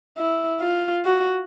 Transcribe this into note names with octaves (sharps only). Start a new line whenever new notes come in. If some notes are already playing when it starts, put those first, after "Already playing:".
E4
F4
F#4